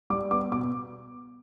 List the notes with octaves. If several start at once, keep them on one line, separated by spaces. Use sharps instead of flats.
G3 D6
B3 D6
B2 D6